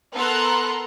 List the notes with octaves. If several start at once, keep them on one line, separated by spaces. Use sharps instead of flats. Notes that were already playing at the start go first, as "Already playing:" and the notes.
B3 A4 A#4 A#5 C6 F#6